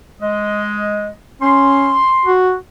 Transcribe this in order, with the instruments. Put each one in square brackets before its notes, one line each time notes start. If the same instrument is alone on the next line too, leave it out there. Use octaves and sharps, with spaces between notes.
[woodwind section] G#3 D#5
[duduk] C#4 [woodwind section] C6
[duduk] F#4